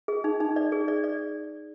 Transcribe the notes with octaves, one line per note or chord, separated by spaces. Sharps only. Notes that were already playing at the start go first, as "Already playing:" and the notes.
G#4
D#4
D#4
D5
G#4
D5
D5